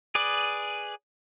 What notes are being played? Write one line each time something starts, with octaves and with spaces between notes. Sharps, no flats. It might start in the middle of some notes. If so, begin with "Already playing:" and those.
G#4 B4 D5